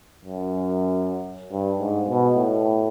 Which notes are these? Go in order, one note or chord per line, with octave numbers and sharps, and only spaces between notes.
F#2
G2
G#2
B2
A2